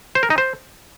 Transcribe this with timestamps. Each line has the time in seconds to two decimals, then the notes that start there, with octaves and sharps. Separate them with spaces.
0.15 C5
0.23 A#4
0.30 D#4
0.38 C5